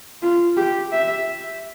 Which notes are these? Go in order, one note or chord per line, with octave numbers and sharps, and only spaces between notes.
F4
G4
E5